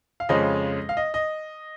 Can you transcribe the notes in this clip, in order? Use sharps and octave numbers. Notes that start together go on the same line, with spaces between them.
F5
F2 C#3 F3 G#3 C#4 D#5
F5
D#5
D#5